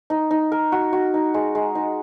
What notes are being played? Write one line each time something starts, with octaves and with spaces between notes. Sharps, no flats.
D#4
D#4
A#4
F#4
F#4
D#4
G#3
G#3
D#4